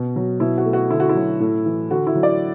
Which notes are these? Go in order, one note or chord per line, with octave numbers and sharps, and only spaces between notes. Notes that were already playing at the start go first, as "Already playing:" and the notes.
Already playing: B2
F#3
B2 E4
F#4
A3
F#4
D3 E4
F#4
E4
F#3
A2
E3
D3 F#4
E4
F#3
D5